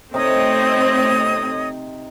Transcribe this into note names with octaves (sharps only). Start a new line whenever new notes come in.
C3 A3 C4 D#4 C#5 D#5 D#6